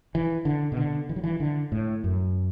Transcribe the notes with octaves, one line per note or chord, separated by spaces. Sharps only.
E3
D3
B2
D3
E3
F#3
E3
D3
A2
F#2